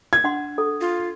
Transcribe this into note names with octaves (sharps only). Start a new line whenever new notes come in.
G#6
D4 F#5 C6
A4
F4